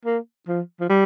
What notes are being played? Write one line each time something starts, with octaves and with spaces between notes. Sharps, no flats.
A#3
F3
F3
G3